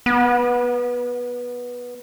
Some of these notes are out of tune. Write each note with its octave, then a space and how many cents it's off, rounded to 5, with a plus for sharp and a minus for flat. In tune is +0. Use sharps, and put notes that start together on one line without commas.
B3 -15